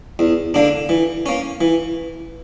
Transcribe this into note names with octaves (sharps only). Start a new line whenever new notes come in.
E2
D3 A#3 D4
E3
A#3 C#4
E3